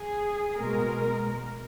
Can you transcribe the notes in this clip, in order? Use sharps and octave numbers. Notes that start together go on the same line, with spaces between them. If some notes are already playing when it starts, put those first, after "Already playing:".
Already playing: G#4
B2 G#3 A#4